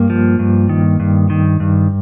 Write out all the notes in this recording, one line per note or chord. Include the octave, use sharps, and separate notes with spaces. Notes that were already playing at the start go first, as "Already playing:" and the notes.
Already playing: G2 A#3
F3
G2
D#3
G2
D#3
G2